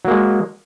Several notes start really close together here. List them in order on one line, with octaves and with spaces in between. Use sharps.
F#3 A#3 G#3